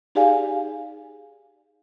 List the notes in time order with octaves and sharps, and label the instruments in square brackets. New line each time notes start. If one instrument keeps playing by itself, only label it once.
[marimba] D#4 G4 G#4 D5 F5 G#5